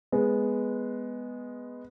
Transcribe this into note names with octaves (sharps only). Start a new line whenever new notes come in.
G#3 B3